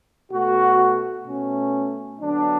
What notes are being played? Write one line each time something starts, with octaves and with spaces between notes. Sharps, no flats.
B2 A3 F#4
B2 A3 C#4
D3 F#3 B3 D4